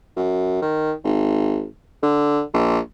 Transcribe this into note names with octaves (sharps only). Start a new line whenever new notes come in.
F#2
D#3
G#1
D3
A#1